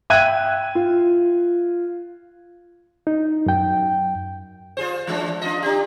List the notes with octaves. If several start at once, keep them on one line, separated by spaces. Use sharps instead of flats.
E5 G5 F#6 G#6 D#7
F4
D#4
F#2 G5
F4 G#4 C5
E3 G#3 D4
D4 F4 D#5
D4 G4